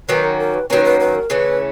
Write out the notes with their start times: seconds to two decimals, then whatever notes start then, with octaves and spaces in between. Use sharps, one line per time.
0.09 D#3 F#3 A#3 C#4 B4
0.24 A#4
0.39 A#4
0.54 B4
0.70 D#3 F#3 A#3 C#4 B4
0.85 B4
1.00 B4
1.15 A#4
1.30 C#3 E3 A3 C#4 B4